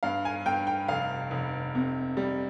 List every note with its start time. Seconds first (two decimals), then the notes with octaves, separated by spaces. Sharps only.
0.03 G2 F5
0.25 G#5
0.46 G2 G5
0.67 G5
0.88 F1 F5
1.31 F1
1.75 C3
2.17 G3